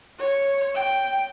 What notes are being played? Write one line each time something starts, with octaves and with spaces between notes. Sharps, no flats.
C#5
G5